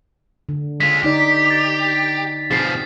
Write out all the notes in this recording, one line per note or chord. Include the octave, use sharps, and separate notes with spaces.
D3
G#3 F4 B6
D3 D#4 G4 D5
A6
B2 F3 C4 G#4 A6 C7